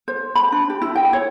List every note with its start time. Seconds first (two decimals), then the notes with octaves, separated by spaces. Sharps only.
0.08 C5
0.35 B5
0.52 D4
0.70 G4
0.82 E4
0.96 G5
1.13 C#5